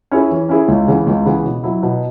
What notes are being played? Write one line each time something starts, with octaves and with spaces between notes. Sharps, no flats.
C#4 E4 G#4
E3
C#4 E4 G#4
C#2
C#3 E3 B3
C#2
C#3 E3 B3
B2
F#3 E4
B2